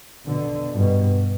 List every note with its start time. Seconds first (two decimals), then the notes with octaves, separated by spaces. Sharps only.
0.26 B2 D3
0.72 G2 B2